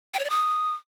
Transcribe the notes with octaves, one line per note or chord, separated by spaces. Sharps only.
G5
C#5
D5
D#6